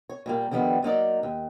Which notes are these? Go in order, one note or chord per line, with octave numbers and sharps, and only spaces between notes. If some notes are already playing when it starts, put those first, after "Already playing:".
C#5
A#2 G3 A#3
D3 D#3 F3 G3 B3
F#3 A#3 D#4 D5
D#2